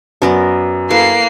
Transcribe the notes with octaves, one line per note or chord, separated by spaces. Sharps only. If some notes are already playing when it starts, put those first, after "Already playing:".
F#2 B3 A#4 D5
A#3 E4 A4 B4 C7